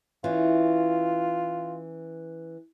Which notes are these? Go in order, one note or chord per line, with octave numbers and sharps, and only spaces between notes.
E3 C#4 F4